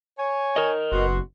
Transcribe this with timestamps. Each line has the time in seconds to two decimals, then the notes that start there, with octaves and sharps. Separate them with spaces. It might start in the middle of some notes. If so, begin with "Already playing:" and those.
0.18 C#5 G#5
0.56 A#4 D#5
0.92 F#1 B2 F#4 C6